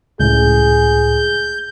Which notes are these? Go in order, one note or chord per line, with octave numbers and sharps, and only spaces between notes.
C#2 A2 G#4 G6